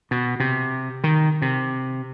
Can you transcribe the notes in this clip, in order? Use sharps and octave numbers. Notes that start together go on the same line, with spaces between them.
B2
C3
D#3
C3